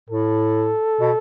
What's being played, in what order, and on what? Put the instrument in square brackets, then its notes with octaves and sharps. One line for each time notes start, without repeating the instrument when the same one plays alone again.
[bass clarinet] A2 [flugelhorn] A4
[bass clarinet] B2